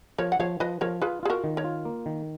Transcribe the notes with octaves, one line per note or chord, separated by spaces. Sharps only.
F3 A#4 C#5
F#5
F3 C#5 F5
F3 B4 D#5
F3 A#4 C#5
F4 G#4 B4
F4 G#4
F#4 A#4
D#3
A#4 C#5
F4
A#3
D#3